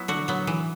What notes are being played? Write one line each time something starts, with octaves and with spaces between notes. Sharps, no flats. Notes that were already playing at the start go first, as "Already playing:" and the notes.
Already playing: F#3 B3 E4
D3 F#4
F#3 B3
E3